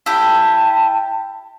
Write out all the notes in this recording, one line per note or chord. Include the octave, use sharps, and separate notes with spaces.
E4 G4 A5